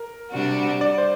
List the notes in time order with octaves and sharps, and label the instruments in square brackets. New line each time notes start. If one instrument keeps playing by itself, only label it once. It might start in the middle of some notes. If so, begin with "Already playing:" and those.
Already playing: [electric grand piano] A#4
[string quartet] C3 G3 D4 F#4
[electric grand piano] D5
C5